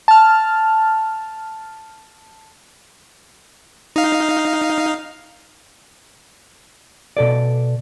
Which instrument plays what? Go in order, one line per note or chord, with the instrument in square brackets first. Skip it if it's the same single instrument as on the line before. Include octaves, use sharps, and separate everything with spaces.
[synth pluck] A5 F6
[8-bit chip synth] D#4 F5
[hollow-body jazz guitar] B2 A4 D5